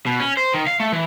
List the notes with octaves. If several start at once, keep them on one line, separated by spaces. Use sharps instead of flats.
B2
C#4
C5
D#3
F5
A3
E3